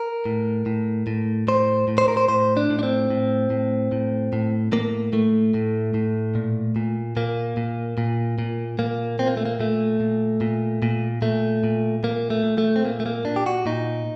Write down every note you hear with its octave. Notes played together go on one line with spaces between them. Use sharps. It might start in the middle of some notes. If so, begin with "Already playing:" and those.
Already playing: A#4
A2
A2
A2
A2 C5
A2
C5
A#4
C5
A2 C5
D4
A2
D4
C4
A2
A2
A2
A2
A2 A#3
A2 A3
A2
A2
A#2
A#2
A#2 A#3
A#2
A#2
A#2
A#2 A#3
A#2 C4
A#3
A3
A#3
A#2 A3
A#2
A#2
A#2
A#2 A3
A#2
A#2 A#3
A3
A#2
A3
C4
A#2 A#3
A3
A#3
A#2 D4
G4
F#4
A#2 D#4